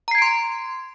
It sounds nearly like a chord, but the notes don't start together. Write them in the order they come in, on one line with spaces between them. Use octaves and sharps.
A#5 C7 G#6 D7 C6